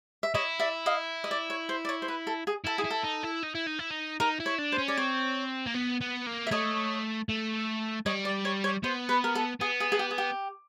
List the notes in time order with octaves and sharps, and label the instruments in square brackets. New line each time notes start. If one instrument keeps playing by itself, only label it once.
[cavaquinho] E5
[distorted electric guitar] E4 [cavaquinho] C#5 D#5
[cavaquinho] D5 E5
D#5 F5
D#5
D5
C#5
C5
D5
C#5
C5
B4
A4
G#4
[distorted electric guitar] E4 [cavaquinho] A4
[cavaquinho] G#4
[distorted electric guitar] E4
[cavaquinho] A4
[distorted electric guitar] D#4
E4
D#4
E4
D#4
E4
D#4
[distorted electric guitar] D#4 [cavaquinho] A#4
[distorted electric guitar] E4
[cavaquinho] C#5
[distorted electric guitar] D4
[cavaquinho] C5
[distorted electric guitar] C#4
[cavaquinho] D5
[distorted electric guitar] C4 [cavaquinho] C#5
[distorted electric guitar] A#3
B3
B3
A#3
[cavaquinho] E5
[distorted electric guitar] A3 [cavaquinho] C#5 D#5
[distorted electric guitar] A3
[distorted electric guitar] G3 [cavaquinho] C#5 D#5
[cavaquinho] D5
C#5
C#5
[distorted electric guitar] B3 [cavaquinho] C5
[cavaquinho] B4
A#4
A4
[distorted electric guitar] B3 [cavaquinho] G#4
[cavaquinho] G#4
G#4
G4
G#4
G4